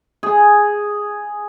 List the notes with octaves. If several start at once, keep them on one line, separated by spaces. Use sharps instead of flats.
G#4